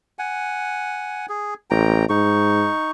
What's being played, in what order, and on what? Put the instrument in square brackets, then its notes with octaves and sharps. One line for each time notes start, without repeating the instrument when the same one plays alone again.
[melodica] F#5 G#5
G#4
[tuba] A1 [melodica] G5 A#5
[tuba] G#2 [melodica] D#4 C#6